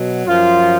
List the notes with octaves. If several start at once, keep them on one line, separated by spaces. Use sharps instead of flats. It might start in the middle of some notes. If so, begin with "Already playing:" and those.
Already playing: B2 F#3
F#2 F3 F4